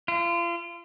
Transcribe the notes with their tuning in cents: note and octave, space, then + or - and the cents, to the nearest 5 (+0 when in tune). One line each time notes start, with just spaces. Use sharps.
F4 -35